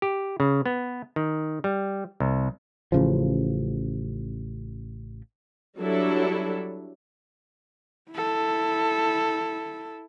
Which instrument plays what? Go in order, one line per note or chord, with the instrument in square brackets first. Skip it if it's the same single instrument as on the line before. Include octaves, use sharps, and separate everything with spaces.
[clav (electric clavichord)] G4
C#3
B3
D#3
G3
C2
[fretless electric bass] A1 C#3 F3
[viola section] F#3 G3 D4 E4 A4
[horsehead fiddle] E4 A4